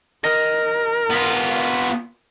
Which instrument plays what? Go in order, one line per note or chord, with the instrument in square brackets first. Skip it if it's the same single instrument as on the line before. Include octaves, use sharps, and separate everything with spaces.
[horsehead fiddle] A#4 [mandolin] D#5 F6
[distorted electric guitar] B3 F4